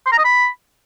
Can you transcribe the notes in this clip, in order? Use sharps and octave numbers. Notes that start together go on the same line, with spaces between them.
C6
A#5
D#5
B5